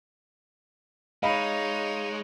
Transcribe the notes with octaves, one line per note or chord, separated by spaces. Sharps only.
G#3 D#4 C#5 D#5 F5 B5